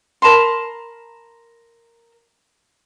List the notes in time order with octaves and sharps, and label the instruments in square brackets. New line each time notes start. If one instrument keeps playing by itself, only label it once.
[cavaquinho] A#4 A5 B5 C6